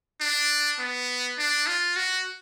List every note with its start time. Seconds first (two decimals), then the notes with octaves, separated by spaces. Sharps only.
0.21 D4
0.79 B3
1.38 D4
1.67 F4
1.96 F#4